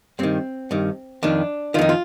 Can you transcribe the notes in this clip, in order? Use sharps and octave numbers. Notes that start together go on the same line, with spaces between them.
G2 D#3 C4
G2 D#3
F2 D#3 D4
F2 D#3 D#4 F4
F4